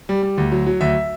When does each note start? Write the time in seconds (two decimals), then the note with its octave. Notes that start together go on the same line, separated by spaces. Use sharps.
0.09 G3
0.23 G3
0.38 D2
0.52 F#3
0.67 F#3
0.81 D2 E5